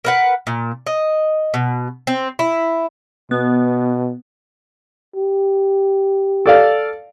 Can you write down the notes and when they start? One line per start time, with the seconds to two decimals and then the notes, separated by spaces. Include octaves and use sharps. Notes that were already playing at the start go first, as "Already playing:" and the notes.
0.05 A#4 B4 F#5
0.47 A#2
0.87 D#5
1.54 B2
2.07 C4
2.39 E4
3.31 B2 B3
5.16 G4
6.46 A4 D5 F5